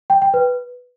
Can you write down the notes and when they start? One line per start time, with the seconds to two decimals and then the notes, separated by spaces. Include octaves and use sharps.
0.10 G5
0.22 G5
0.34 B4